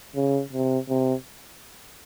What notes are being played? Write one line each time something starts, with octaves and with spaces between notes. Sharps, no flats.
C#3
C3
C3